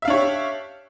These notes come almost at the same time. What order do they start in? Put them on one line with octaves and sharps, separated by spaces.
E5 F5 D4 C#5 G4